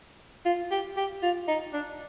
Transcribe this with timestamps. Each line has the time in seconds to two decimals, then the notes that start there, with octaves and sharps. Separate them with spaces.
0.45 F4
0.71 G4
0.97 G4
1.23 F4
1.48 D#4
1.73 D4